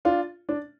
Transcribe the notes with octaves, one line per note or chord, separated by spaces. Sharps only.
D4 F4
D4